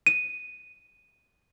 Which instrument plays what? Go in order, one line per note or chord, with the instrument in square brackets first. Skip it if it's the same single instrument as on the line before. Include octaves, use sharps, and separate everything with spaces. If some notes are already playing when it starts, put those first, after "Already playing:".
[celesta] D#7